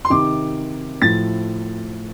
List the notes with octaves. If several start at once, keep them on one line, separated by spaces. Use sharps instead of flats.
C6
C3 D#3 D6
A2 F3 A6